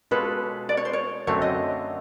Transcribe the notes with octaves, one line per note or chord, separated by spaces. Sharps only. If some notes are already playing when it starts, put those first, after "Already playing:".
B2 G#3 C#4 F4 A4 B4
D5
C#5
C5
C#5
F#2 D3 F#3 A3 C4 C#5
D#5